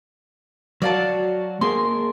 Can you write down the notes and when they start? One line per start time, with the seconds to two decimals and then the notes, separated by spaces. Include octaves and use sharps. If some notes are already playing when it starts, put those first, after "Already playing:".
0.82 F#3 F#4 D5 F5 A5
1.61 A#3 G#4 A#4 C6